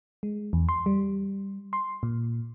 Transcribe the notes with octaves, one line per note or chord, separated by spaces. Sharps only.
G#3
E2
C6
G3
C6
A#2